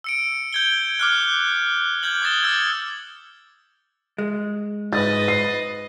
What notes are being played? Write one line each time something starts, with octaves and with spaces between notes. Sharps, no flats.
E6 C#7 D7
G6 G#6 G7
D6 F6 F#6
F6 G6 G#6 F#7
D6 D#6 G#6 A6 E7 G7
E6 G6 G#6
G#3
G#2 B4 D#5 A6
C7